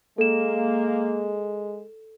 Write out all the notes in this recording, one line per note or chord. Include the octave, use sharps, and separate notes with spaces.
G#3 A#3 A4 E7